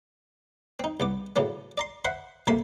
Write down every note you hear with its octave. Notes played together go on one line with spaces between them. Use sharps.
C4 D#4
C2 B3 D6
A2 C#3 F3 F#3 B3
D5 A#5 C6
C5 E5 F#5 B5 C6
A#1 C3 A3 A#3 B5 C6